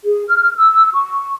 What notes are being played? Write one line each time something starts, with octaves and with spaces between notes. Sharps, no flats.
G#4
F6
E6
C#6